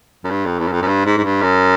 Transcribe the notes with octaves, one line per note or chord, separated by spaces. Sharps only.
F#2
G2
F2
E2
F#2
F2
F#2
G2
G#2
G#2
G2
F#2